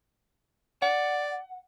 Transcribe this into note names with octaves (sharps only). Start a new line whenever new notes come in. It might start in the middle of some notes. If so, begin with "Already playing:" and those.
D5 F#5